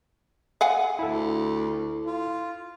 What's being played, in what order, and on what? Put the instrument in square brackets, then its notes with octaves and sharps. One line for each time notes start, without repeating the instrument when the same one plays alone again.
[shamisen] F5 F#5 G#5
[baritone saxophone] D2 [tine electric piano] E4 A4
[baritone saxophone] F4